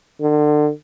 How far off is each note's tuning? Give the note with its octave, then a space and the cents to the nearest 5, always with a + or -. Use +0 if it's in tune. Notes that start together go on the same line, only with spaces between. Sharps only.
D3 +30